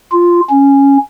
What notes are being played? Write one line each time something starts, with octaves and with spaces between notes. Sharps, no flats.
F4
C#4